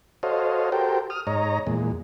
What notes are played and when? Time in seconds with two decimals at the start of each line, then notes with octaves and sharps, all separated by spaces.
0.23 F#4 A4 C5 C#5 D#5 F5
0.72 F#4 G4 A4 A#4 C5 G5
1.10 D#6 F6
1.27 G#2 C#5 D#5 A#5
1.67 E2 A#2 G#3